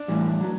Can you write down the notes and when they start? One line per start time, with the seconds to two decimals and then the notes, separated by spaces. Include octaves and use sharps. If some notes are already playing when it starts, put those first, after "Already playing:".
Already playing: D4
0.08 A2 E3 G3
0.41 F#3